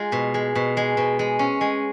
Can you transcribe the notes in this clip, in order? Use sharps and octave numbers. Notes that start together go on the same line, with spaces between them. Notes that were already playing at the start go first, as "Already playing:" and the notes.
Already playing: G#3 F4
B2
G#3
B2
G#3
B2
G#3
C#4
G#3